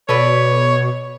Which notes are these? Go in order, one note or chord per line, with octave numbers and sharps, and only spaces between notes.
B2 A4 B4 C#5 D5